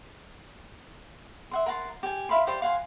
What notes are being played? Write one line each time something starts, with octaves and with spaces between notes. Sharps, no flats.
E5 F#5 C6
A#4 F#5 A5 C6
G4 G#5
E5 F5 B5 C6
G4 C5 D5 C6
F5 F#5 G#5 C6